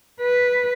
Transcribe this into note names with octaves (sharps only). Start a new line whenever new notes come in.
B4